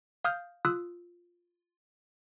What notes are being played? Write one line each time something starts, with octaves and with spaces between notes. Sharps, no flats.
F5 D#6 F6 G6
F4 D#6 E6 F#6